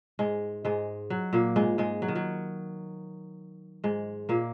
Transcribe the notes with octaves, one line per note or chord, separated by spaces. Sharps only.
G#2 G#3
G#2 G#3
F#3
A#2 A#3
G#2 G#3
G#2 G#3
F#3
D#3
F#3
G#2 G#3
A#2 A#3